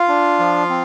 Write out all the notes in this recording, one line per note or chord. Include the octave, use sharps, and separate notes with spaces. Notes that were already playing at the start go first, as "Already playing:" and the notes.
Already playing: F4 F5
D4
F3
C4